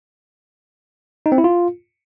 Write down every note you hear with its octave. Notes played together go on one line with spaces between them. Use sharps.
D#4
C4
E4
F4